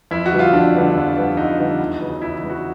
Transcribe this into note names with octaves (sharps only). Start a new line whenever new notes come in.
F2 E4
F#4
D3 G3 B3
F4
F2 D4
D3 G3 B3
F2
D3 G3 B3
F2 D#4
D3 G3 B3
E2
C#3 F#3 B3
E2 E4
C#3 F#3 B3
F#4